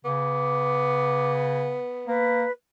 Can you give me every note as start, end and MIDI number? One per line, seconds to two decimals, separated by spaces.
0.05 1.80 49
0.05 2.29 59
0.05 1.33 86
2.08 2.45 58
2.08 2.51 71